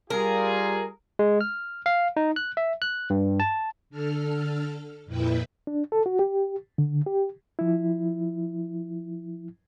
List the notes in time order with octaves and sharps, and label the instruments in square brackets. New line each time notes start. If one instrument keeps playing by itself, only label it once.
[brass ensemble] G3 F4 G#4 [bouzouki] A#4
[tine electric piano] G#3
F6
F5
D#4
F#6
E5
F#6
G2
A5
[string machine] D3 A4 F6
F2 A#2 E4 B4 G5
[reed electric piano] D4
A4
F#4
G4
D3
G4
F3 E4